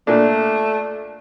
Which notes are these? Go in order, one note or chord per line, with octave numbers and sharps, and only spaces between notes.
A#2 A3 D4